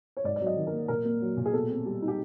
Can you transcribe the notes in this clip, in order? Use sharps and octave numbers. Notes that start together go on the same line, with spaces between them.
C#5
G#2 D5
F#3 D5
D#5
D#3
A#4
A#3
A#2 A#4
A#3
F#3
A#2
G#4
B2 A4
C4
G3
D#4
G4